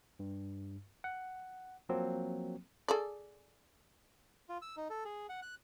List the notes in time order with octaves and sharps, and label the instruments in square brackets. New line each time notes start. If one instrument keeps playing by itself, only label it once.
[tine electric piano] G2
F#5
F3 F#3 A#3 C4
[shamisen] G#4 A4 D5
[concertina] F4
E6
D#4
A4
G#4
F#5
F#6